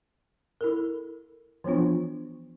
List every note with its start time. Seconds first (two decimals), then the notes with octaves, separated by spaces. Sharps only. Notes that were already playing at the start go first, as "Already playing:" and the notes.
0.61 E4 A4 A#4
1.64 E3 F3 B3 D4 F4